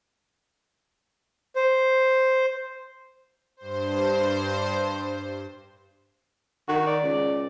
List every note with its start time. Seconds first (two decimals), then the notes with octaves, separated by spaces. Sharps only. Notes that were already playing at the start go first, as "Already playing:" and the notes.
1.56 C5
3.57 G2 C5
6.68 D#3 F#4
6.86 D5
7.03 C#2